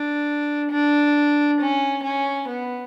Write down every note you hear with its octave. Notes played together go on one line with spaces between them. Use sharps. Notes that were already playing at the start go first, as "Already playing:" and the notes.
Already playing: D4
D4
C#4
C#4
B3